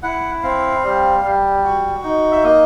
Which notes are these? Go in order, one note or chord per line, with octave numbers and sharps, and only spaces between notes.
E4 F#5
C4 F5
G3
G3
F#4
D#4
E5
A#3 D#5